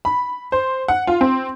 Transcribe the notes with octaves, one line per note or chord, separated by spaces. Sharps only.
B5
C5
F#5
F4
C4